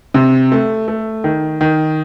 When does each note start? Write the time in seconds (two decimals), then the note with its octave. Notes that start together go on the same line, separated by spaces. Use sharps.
0.14 C3
0.52 A3
0.88 A3
1.24 D#3
1.61 D#3